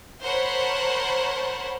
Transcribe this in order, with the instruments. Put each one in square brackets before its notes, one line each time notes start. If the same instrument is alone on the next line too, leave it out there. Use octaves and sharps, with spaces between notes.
[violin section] A#4 C5 C#5 F#5 A5 B5